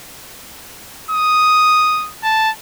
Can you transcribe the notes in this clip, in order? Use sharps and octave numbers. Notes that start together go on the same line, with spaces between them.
D#6
A5